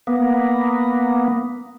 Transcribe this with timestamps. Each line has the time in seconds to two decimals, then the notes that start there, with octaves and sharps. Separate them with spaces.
0.07 A#3 B3